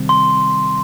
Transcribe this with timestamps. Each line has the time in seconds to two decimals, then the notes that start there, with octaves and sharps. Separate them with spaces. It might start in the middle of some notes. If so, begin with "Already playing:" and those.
Already playing: C3 D#3 G3 C4
0.09 C6